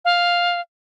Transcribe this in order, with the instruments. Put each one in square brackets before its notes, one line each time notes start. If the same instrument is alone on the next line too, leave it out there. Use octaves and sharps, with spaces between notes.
[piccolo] F5